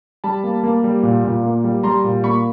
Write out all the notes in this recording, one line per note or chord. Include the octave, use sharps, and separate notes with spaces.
G3 A5 B5
A#3
A#3
G3
A#2
A#2
A#3
G3
G3 A#5 C6
A#2
A#3 B5 C#6